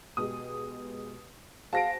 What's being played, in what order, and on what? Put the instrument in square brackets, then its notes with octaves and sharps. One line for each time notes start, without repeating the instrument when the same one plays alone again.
[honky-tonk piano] B2 G#3 G4 [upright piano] D#6
[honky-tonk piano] F#4 G#4 C5 [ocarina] F5 [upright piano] A5 A#6 D7